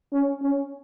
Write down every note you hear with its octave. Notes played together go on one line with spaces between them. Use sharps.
C#4
C#4